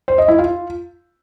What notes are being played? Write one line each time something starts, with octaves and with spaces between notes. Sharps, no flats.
C5
D#5
E4
F4